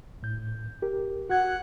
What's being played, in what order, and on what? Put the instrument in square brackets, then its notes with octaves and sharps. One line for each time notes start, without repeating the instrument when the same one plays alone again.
[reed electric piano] A2 G6
G4 A#4
[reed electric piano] F#4 G#6 [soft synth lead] F#5